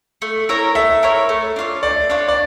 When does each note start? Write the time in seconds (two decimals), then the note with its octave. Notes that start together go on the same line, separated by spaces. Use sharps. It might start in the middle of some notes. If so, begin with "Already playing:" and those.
0.22 A3
0.49 E4 A#4 C#5
0.75 A3 E5
1.03 E4 A#4 C#5
1.29 A3
1.56 D4 F4 C#5
1.83 A3 D5
2.10 D4 F4 C#5
2.28 D5